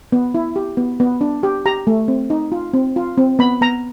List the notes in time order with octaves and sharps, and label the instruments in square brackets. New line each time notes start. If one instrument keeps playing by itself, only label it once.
[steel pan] B3
E4
G4
B3
B3
D4
G4
G4 A#5
A3
C4
D#4
F4
C4
F4
C4
B3 B5
B3 A#5